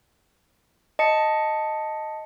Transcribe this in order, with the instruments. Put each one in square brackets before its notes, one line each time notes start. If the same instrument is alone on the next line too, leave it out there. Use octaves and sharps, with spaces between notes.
[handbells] D#5 A5 C#7